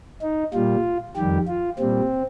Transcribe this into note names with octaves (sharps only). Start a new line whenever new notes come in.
D#4
A#2 G3 F4
F2 D#3 G3 G4
F4
A#2 G3 C4